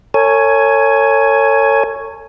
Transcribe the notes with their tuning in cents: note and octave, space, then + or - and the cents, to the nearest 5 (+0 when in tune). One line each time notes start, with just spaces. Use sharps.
A4 +45 C#5 +0 G#5 +10